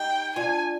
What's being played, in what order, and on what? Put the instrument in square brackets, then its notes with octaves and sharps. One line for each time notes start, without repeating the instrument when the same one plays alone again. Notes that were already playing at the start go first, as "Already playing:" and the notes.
Already playing: [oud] D#4 G4 [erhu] G5
[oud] D4 F4 [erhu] G#5